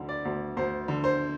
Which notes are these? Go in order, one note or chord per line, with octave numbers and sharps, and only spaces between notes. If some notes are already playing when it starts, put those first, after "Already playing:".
Already playing: D2 D3
D5
D2
D2 C5
D3
C5